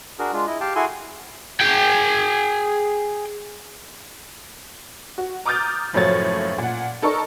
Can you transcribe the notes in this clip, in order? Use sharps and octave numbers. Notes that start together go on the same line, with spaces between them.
D4 F#4 G#4 A#4
G#3 D4 F4
E4 D#5
G4 F5 G5 A5
E4 F#4 G#4 A4 G#5 C6
G#4 G5
F#4
A#5 D6 D#6 F6 G6 A6
F#1 A2 F3 F#3 C#5 A6
A#2 F#5
D#4 A4 A#4 D5 C#6